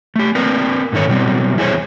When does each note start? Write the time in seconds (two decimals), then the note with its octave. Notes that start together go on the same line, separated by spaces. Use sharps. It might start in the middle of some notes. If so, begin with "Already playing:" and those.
0.16 A3 G4
0.35 C4 D4 A#4 B4
0.92 G#2 D3 D#3 A3 C#5
1.08 B2 F#3 G3 C4
1.57 E2 E4 G#4 C5 C#5